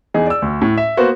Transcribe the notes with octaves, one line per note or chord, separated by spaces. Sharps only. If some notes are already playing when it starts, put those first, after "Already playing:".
E2 D#4 G#4
D5 E6
D2
A2
E5
A#3 B3 F#4 C5